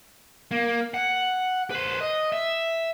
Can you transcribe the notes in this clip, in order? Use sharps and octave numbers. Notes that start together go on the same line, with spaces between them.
A#3
F#5
B4 C5
D#5
E5